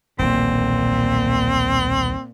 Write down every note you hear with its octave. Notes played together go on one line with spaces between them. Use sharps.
D#1 B1 A#2 E3 C4